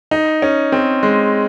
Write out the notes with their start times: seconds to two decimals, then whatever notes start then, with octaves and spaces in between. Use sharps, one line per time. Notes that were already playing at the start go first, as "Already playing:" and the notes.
0.11 D#4
0.42 C#4
0.72 C4
1.03 G#3